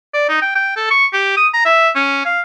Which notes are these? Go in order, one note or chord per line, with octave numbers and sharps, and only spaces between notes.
D5
D#4
G5
G5
A4
C#6
G4
D#6
A#5
E5
C#4
F5